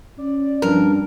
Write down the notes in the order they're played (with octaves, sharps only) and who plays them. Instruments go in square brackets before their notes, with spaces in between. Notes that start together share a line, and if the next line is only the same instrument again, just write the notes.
[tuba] C#4 [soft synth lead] D5
[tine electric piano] G2 D4 [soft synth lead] F3 [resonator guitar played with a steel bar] A#4